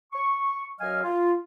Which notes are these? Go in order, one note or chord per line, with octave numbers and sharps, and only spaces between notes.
C#6
F#2 F#3 D#5 F5 G#5 F6
F4